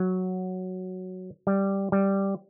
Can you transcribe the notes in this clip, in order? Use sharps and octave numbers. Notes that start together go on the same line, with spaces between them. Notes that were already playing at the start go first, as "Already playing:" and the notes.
Already playing: F#3
G3
G3